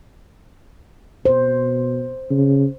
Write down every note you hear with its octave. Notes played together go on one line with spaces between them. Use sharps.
B2 C5
C#3